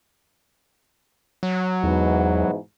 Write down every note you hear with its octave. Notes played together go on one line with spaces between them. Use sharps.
F#3
E2 G#2 B2 E3